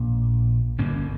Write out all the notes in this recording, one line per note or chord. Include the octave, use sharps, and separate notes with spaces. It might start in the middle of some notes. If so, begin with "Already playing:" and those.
Already playing: A#1 A#2
G1 G2 D3 A#3 C#4